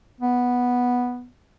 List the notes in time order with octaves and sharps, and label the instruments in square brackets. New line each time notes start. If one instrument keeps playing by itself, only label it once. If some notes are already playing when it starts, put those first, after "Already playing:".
[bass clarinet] B3